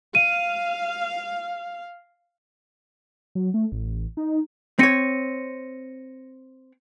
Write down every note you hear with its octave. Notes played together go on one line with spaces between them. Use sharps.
F5 D#7
F#3
A3
A1
D#4
C4 C#5 A#6 C#7 D#7